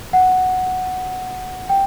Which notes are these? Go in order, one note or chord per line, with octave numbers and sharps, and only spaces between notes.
F#5
G5